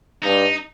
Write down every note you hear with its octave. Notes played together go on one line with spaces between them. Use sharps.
G2 D#4